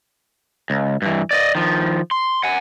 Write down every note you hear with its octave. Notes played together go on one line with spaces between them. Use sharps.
C#2
G2 E3
D5 D#5
D#3 F3
C6
F#5 G#5